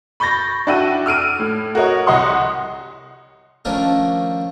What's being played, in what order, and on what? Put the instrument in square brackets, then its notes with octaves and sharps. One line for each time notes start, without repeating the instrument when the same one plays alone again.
[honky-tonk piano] B5 C#6 G6 A6 A#6
D4 E4 F#4 G5 E6 D#7
E6 F6 D7 D#7
A2
F#4 A#4 C#5 D#5
C2 D#5 F#5 C6 D#6
[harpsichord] D#3 F3 A3 C#4 D4 A#4